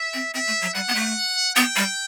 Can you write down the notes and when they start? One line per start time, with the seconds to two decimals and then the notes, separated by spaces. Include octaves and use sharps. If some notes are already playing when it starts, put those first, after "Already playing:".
Already playing: E5
0.14 C4
0.34 C4 E5
0.47 A3
0.61 F#3
0.75 G3 F#5
0.88 B3
0.95 A3
1.56 B3 G5
1.76 G3